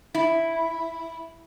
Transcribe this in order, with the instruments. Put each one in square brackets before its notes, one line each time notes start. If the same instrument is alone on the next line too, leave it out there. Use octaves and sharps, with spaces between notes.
[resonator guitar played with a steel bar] E4